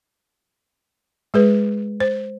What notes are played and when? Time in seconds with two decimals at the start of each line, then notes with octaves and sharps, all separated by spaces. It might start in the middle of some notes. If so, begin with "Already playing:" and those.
1.34 G#3 G#4 B4
2.00 C5